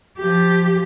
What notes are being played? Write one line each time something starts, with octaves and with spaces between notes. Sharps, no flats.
F3 G4